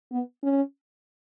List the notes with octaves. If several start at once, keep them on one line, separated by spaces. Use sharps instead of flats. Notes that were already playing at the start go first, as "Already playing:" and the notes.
B3
C#4